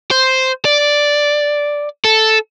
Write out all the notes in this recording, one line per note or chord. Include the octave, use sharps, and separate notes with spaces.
C5
D5
A4